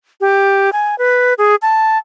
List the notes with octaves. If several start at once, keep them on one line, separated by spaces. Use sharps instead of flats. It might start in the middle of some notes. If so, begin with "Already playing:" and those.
G4
G#5
B4
G#4
A5